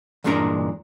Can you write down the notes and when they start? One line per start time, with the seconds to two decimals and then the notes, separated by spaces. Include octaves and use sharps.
0.24 E2 G2 A#2 G#3 D4 A#4